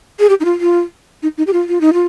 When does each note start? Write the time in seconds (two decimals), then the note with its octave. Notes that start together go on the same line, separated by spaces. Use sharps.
0.19 G#4
0.29 G4
0.40 D#4
0.45 F4
0.61 F4
1.23 D#4
1.38 D#4
1.47 G4
1.53 F4
1.69 F4
1.81 D#4
1.93 F4